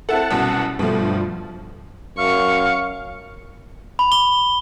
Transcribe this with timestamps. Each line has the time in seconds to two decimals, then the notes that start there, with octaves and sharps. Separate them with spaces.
0.09 C4 E4 A4 F#5 A5
0.31 C2 F#2 B2
0.79 G2 B2 F3 A3
2.18 F#2 F5 C#6
3.99 B5
4.12 G7